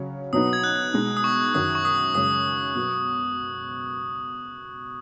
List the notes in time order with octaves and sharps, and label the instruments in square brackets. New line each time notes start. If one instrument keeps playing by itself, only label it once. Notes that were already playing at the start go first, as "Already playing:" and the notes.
Already playing: [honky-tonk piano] C#3 F#3 C#4
[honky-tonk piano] B2 F#3 B3 D#4 [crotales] D#6
[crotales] G#6
F#6
[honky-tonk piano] B2 G#3 D#4
[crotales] D#6
C#6
[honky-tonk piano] F#2 D#3 F#3 [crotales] D#6
[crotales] C#6
D#6
[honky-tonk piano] F#2 C#3 G#3 C#4 [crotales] D#6
[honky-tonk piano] B2 F#3 B3